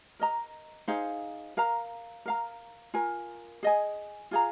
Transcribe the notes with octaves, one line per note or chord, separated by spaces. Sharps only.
A#4 D#5 A#5
D#4 G#4 C5 F5
A#4 F5 A#5
A#4 F5 A#5
F4 A#4 G#5
G#4 D#5 G#5
F4 G#4 F5 A#5